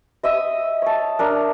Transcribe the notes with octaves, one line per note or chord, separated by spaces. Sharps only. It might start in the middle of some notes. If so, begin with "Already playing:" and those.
D#5 E5 D#6
C#5 A5
D4 A#4